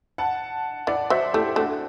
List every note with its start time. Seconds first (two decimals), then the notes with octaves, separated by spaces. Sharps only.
0.18 F#5 A5
0.87 E3 D5 F#5
1.10 F#3 C5 E5
1.34 A3 E4 G4
1.56 A3 D4 F#4